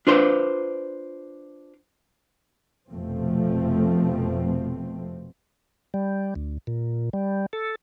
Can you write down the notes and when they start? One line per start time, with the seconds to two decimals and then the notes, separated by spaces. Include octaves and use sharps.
0.07 D4 F4 B4 C5
2.91 F1 F2 B2 F3 A3 C4
5.94 G3
6.36 D2
6.67 A#2
7.13 G3
7.53 A4